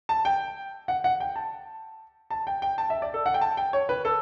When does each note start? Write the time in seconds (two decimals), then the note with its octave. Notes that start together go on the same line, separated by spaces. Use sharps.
0.09 A5
0.25 G5
0.88 F#5
1.04 F#5
1.20 G5
1.36 A5
2.30 A5
2.47 G5
2.62 G5
2.78 A5
2.90 E5
3.02 D5
3.14 A4
3.26 F#5
3.34 G5
3.41 A5
3.57 G5
3.73 C#5
3.89 B4
4.05 A4